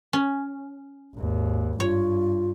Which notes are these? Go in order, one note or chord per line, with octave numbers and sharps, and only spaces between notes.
C#4
G#1 D#2
G2 F4 C#5